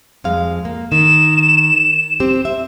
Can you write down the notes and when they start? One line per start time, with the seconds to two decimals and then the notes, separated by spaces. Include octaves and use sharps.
0.24 F2 G#3 F5
0.65 A#3
0.92 D#3 E7
2.20 C4 G4
2.45 E5